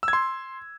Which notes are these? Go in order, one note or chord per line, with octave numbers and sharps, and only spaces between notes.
E6
G#6
C6